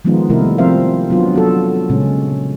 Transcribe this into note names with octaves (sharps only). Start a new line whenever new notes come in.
D#3 F3 G#3 B3 D#4 F4
C3 D#3 G3 A3 E4 A#4
F3 C4 A#4 C5 E5 F5
F#3 B3 D4 F4
F#4 A4
A#2 C#3 G#3 C#4